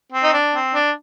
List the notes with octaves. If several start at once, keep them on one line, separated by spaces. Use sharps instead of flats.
C4
D#4
D4
C4
D4